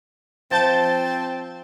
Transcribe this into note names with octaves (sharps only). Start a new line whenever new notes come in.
F3 C4 A5 G6 A6